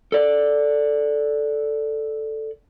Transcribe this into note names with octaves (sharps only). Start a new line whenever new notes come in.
A4 D5